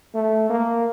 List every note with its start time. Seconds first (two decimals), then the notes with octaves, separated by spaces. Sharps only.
0.15 A3
0.50 A#3